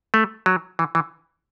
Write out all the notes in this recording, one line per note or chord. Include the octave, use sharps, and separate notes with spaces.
A3
F#3
E3
E3